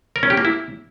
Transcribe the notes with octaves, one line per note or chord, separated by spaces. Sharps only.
A#4
C#4
G4
A#3
E4